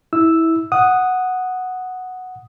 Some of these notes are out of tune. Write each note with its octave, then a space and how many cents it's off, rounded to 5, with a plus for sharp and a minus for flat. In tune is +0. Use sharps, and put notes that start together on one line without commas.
E4 -20 E6 +0
F#5 +0 D#6 +0